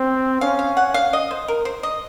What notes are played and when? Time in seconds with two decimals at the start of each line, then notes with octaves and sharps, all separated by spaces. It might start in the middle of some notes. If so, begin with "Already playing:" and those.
Already playing: C4
0.41 C#4 F5
0.59 F5
0.77 F#5
0.94 F5
1.13 D#5
1.31 C5
1.48 A#4
1.65 C5
1.83 D#5